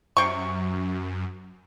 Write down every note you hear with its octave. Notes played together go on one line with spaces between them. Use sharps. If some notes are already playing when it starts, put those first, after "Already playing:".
F#2 C3 G5 C#6